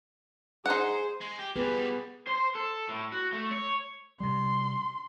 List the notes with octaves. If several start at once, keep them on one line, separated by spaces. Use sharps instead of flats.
D#4 G#4 C5 F#5
G#3
G4
A#2 G3 B3 G#4 B4
C5
A4
A2
F#4
A3
C#5
C3 G3 C6